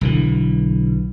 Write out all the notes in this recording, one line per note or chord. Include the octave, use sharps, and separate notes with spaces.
B1 D3 E3